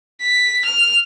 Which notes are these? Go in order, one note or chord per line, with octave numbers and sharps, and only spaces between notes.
B6
F6